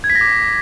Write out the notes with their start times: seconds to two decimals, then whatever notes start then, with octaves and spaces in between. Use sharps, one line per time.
0.04 G#6
0.10 B6
0.15 A#6
0.21 D6